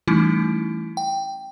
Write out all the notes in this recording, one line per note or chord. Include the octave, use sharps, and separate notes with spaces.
E3 G3 A3 C#4 D#4 E4
G5